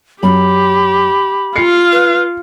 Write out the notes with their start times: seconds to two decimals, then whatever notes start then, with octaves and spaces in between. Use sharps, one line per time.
0.23 F#2 G4 B5
1.56 F4 F5 C7 C#7
1.92 B4